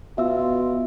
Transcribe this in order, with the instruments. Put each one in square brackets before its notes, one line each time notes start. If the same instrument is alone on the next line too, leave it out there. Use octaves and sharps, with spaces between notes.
[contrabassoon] B2 [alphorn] F4 [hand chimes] E5 E6